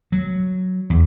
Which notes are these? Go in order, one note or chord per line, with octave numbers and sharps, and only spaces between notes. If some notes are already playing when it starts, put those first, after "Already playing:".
F#3
E2